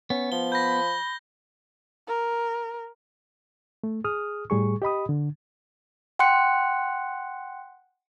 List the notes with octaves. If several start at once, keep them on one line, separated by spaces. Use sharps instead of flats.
B3 C#4
F3 G7
B5 G6 A#6
A#4
A3
G#4 D#6 F6
A2 G3 G#4 C#6
G4 D#5 B5 D#6
D3
F#5 G5 C6 F#6 C#7